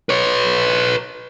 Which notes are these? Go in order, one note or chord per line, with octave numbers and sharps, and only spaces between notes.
B4 C#5